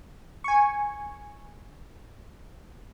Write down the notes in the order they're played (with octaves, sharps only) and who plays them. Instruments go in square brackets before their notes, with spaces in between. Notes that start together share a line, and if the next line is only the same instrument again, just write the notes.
[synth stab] G#5 C#6